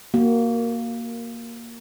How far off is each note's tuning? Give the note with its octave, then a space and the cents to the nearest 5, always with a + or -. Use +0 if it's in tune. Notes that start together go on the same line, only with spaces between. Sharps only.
A#3 +0 F#4 +20